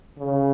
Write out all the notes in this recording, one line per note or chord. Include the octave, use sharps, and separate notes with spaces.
C#3